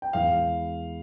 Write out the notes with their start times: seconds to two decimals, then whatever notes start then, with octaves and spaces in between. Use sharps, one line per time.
0.02 G5
0.13 E2 E3 G#3 F5